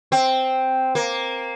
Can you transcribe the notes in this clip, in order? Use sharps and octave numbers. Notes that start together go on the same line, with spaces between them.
C4
A#3